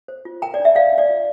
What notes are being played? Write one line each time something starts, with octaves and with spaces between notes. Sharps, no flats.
C5
F4
A#4 G5 A#5
D5
D4
E5
C5 D5 F5
D4
D5
F4